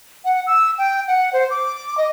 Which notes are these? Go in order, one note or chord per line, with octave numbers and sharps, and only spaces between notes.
F#5
E6
G5
F#5
C5
D6
D#5